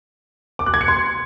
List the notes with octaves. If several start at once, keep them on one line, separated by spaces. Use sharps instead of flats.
D6
F#6
G#6
C#7
C6